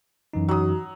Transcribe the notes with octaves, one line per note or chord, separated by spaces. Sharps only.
F#2 E3 D#4
F#3 D#6